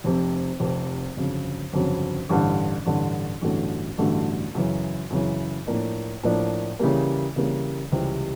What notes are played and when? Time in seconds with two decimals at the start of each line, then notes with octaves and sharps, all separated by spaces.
0.04 F1 F2 C3
0.60 F1 F2 C3
1.17 G1 F2 C#3 F#3
1.73 G1 F2 C#3 F#3
2.29 A1 G2 D3
2.85 A1 G2 D3
3.42 A1 G2 D3 F#3 A3
3.98 A1 G2 D3 F#3 A3
4.55 F#2 C#3 E3
5.10 F#2 C#3 E3
5.67 A2 F3 A#3 D4
6.23 A2 F3 A#3 D4
6.79 C#3 E3 G3 A#3
7.36 C#3 E3 G3 A#3
7.92 C#2 C3 E3 G3 C4